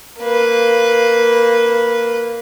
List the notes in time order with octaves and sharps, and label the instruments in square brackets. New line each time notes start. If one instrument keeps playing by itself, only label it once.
[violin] A#3 B4